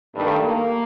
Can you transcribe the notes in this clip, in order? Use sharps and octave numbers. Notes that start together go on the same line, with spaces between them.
G2 D#3 A3
A#3